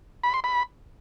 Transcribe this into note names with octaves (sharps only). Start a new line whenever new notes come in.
B5
C6
B5